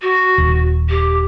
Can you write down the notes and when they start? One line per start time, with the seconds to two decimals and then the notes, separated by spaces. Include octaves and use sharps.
0.01 F#4
0.38 D#1
0.89 G4